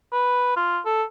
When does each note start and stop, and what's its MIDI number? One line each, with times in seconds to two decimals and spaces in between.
0.13 0.52 71
0.56 0.80 65
0.85 1.03 69